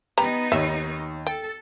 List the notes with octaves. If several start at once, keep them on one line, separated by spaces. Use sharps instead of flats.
G3 B3 D#4 B4 A#5
D#2 C#5 E5
A4 G5